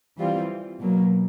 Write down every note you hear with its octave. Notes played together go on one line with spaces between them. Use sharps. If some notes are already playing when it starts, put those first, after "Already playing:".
E3 G3 C4 F4
B2 F#3 A#3